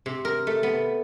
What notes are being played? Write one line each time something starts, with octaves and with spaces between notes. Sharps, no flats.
C3
A#4
A3
B3